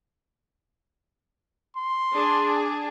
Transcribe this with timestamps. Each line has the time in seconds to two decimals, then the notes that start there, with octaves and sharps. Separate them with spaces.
1.77 C6
2.13 D4 G#4